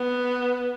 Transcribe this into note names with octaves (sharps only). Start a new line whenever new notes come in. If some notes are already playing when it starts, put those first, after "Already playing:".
Already playing: B3